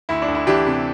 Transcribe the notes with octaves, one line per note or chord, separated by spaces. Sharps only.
D2 E4
D4
D2
E4
E3 D4 G4
C3